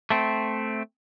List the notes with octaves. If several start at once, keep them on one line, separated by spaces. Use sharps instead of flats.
A3 C4